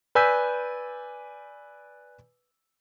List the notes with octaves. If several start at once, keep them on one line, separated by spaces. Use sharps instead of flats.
B4 D5 G#5 E6 G6 B6